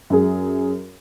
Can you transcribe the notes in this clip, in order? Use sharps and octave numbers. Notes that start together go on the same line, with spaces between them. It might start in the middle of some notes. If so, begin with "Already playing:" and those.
F#2 G#4